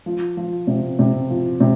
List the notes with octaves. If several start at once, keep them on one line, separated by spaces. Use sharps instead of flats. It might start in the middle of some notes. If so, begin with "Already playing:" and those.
F3
F3
C3
C3
F3
C3